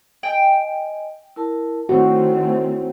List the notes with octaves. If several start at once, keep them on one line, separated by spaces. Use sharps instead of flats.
D#5 G5 G#5
E4 A#4 A5
D#3 A3 C4 E4 F#4 C5 C#5